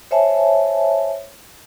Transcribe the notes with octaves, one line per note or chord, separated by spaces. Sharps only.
C5 C#5 E5 G#5 A5